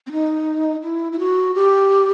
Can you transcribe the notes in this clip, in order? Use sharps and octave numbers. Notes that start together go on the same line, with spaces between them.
C4
D#4
E4
E4
F#4
G4